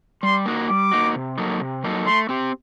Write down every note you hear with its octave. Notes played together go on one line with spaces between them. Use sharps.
G3 C6
A#3 D#4 F#4
G3 D6
A#3 D#4 F#4
C3
F#3 A#3 D#4 A4
C3
F#3 A#3 D#4 A4
A3 C6
C4 G4